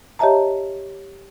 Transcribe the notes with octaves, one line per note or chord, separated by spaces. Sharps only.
G4 C#5 D#5 E5 A5 A#5